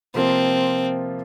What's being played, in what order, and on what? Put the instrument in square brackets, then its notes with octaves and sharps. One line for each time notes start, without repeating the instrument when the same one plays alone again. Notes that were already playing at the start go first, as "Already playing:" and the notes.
[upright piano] C3 F3 A#3 F4 [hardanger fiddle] C4